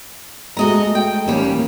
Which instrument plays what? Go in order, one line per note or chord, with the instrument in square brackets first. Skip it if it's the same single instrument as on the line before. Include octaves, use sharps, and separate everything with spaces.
[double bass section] G#3 A3 [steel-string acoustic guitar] F#4 D#5 A#5
[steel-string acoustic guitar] G5
[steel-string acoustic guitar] D#2 G3 [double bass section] E3 A#3 C#4